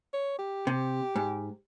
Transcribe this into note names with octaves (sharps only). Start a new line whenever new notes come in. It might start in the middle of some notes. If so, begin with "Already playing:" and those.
C#5
G4
C3
G#2